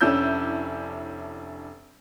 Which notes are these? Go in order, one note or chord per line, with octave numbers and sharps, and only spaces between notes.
F1 C#4 D4 E4 E6 G6